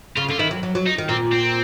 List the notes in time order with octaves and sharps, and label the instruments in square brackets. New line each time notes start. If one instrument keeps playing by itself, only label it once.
[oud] C#3 [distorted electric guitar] F4
[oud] D3 [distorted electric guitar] F4
[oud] D#3 [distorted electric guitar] E4
[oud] F#3
F#3
F#3
[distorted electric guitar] D#4
[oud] D#3
[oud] A#2 [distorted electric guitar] C4
[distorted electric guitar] C4